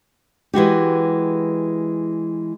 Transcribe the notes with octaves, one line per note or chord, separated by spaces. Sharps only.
E3 G#3 F#4 G4